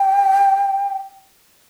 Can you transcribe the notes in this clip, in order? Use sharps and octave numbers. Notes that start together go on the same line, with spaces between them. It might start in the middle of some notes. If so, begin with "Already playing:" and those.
Already playing: G5